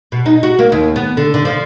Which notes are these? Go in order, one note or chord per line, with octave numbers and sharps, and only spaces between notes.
B2
D#4
F#4
A#3
D#2
B3
D3
D3
F3